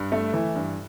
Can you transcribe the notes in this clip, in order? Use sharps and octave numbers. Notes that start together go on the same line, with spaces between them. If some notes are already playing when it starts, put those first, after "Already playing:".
Already playing: G2
A3
E3
G2